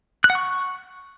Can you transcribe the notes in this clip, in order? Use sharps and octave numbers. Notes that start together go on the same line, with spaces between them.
F#6
F#5
C#6